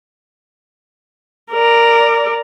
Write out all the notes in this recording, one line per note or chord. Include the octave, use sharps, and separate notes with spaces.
A#4 D5